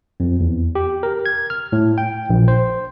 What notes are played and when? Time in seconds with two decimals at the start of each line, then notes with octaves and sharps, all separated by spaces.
0.20 F2
0.40 E2
0.75 G4
1.03 A#4
1.26 G#6
1.50 F6
1.72 A2
1.98 G5
2.30 A#1
2.48 C5